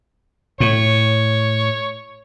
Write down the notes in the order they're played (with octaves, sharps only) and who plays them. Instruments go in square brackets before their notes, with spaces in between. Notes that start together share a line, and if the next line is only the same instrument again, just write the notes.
[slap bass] A2 [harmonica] C#5